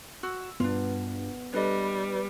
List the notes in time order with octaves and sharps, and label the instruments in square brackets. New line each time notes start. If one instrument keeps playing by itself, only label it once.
[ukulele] F#4 [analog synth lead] E6
[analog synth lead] G2 [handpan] B3 [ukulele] D4 F4
[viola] G3 [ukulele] D4 A4 D#5 [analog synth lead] B4